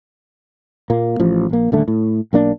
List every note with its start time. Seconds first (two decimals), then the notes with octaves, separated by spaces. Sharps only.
0.90 A#2 A#3
1.20 A1 F3
1.49 A#1 A#3
1.72 D#1 D3 A3
1.88 A2
2.33 B1 A#3 D4